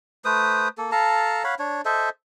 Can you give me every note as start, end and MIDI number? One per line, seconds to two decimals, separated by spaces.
0.25 0.68 57
0.25 0.68 71
0.25 0.68 72
0.25 0.68 87
0.78 0.91 58
0.78 0.91 69
0.92 1.43 69
0.92 1.43 77
0.92 1.43 81
0.92 1.43 82
1.44 1.55 73
1.44 1.55 77
1.44 1.55 78
1.44 1.55 83
1.59 1.81 62
1.59 1.81 73
1.85 2.09 69
1.85 2.09 72
1.85 2.09 75
1.85 2.09 76